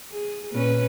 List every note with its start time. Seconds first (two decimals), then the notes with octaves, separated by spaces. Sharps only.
0.12 G#4
0.53 A#2 C#4 B4